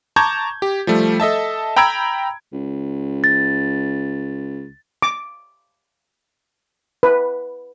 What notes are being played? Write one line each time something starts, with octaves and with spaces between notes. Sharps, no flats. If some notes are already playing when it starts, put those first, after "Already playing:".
A5 A#5 C#6 D6 G6 G#6
G4
F3 G3 A3
A4 D#5 E5 A5
G5 A#5 B5 E6 G#6 D7
C#2
A6
D6
B4